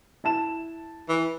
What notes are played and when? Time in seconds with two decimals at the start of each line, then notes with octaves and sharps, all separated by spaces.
0.24 E4 A5 E7
1.09 E3